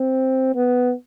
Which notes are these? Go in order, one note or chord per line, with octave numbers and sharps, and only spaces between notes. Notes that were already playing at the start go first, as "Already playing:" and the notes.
Already playing: C4
B3